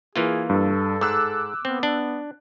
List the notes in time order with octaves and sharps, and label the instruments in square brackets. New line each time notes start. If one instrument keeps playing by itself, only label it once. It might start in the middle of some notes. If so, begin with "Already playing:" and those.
[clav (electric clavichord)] E3 A#3 F4 [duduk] G#4
[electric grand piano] G2 [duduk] A4
[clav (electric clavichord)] G#2 [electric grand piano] D6 E6 F#6
[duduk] B3 [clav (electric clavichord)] C4
[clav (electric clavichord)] D4